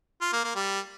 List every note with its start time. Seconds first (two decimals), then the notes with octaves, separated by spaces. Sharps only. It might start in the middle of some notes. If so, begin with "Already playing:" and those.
0.21 F4
0.33 A#3
0.44 A#3
0.56 G3